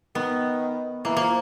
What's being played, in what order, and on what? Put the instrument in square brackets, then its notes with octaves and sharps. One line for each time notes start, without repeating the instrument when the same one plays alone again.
[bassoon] D#3 [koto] B3
[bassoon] E3 [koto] A#3
[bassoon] F3 [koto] A#3